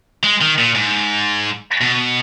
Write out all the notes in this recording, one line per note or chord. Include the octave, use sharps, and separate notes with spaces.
G#3
D#3
A#2
G#2
B2